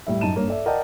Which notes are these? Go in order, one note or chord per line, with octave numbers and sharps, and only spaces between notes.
A2 G3 E5
F#2 D#4 A5 D#7 E7
G2 A#3 C#5
A4 D5 E5
A#4 D5 D#5 F#5 G5 A5